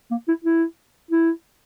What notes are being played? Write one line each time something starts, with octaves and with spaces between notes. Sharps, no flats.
A#3
E4
E4
E4